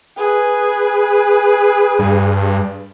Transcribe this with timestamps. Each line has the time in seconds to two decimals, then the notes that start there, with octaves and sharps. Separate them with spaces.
0.18 G#4 B4
1.99 G2